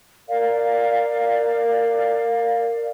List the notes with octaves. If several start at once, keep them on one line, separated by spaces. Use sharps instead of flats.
A#4 D5 F5